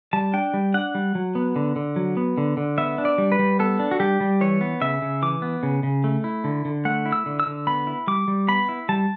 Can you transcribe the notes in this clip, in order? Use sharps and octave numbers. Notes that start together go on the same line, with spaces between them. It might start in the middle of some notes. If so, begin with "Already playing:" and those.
G3 A5
D4 G5
G3
D4 F#5
G3
F#3
B3
D3
D3
F#3
B3
D3
D3
B3 E5
D4
D5
G3
B4
G3
B3 A4
D4
F#4
G3 G4
G3
E3 C#5
B3
C#3 E5
C#3
E3 D6
B3
C#3
C#3
A3
E4
D3
D3
A3 F#5
E4
E6
D3
E6
D3
B3 B5
E4
G3 D6
G3
B3 B5
E4
G3 A5